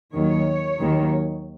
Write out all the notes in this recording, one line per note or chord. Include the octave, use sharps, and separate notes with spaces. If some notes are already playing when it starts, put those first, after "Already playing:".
D#2 D#3 F#3 C#5
D#2 D#3 F#3